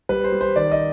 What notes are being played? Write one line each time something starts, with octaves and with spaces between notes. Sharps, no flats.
G3 B4
C5
G3
C5
D#3 D5
D#5